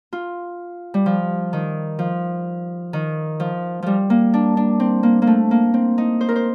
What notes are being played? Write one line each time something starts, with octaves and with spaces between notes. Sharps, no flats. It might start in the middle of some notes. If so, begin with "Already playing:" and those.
F4
G3
F3
D#3
F3
D#3
F3
F3 G3
A#3
D4
D4
C4
A#3
A#3
A3
A#3
C4
D#4
C5
A#4
C5